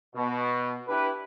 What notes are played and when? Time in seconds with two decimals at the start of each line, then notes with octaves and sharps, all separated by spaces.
0.15 B2
0.88 D4 E4 G4 B4